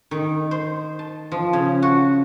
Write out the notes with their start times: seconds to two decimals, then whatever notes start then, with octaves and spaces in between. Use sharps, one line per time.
0.11 D#3
0.51 C5
0.99 A5
1.32 F3
1.53 C#3
1.83 F#4